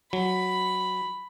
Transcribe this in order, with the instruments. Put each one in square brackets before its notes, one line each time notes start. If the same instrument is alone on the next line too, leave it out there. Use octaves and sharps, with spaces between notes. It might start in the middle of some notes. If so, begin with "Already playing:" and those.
[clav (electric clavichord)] F#3 [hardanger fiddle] B5